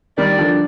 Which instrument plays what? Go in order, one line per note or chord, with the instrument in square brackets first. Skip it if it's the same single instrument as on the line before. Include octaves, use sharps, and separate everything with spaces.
[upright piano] D#3 G3 [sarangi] D5
[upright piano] D3 F3